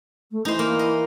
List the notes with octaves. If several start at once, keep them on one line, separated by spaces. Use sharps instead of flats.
A3
E3 D#4 C5
A#3
D#5